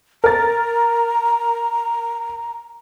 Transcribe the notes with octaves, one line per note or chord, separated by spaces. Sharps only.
A#4 A#5 A6